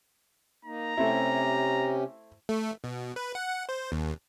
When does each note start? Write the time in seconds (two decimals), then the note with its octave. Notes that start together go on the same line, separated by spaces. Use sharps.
0.65 A#3 D#4 A#5
0.97 C3 A3 C4 C#4 E4 G4
2.49 A3
2.84 B2
3.16 B4
3.35 F#5
3.69 C5
3.92 D#2